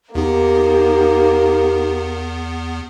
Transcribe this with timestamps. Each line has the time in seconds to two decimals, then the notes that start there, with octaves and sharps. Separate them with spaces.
0.15 E2 A#3 B3 D#4 G4